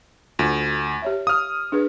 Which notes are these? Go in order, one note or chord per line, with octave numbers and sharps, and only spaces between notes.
D2 F4
G4 C#5 E5
F5 D#6 F6
D4 G#4 B4